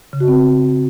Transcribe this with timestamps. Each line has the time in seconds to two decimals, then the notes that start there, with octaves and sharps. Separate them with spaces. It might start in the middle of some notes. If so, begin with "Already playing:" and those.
0.13 C#3
0.20 F#4
0.28 C4